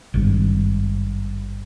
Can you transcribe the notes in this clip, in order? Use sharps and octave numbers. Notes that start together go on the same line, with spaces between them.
G#1 G2